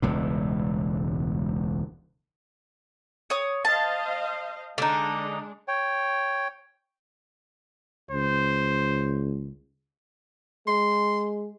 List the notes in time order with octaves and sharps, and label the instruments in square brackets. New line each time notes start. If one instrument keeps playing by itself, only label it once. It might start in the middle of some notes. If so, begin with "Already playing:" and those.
[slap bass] E1 C#2 A2
[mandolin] C#5 D#6
[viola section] C5 D#5 F5 [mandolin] A5
[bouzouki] D3 D#4 [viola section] G#3 D4
[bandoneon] C#5 G5
[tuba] C#2 [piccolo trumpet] C5
[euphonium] G#3 [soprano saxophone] C6